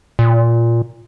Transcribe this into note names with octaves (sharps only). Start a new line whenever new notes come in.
A#2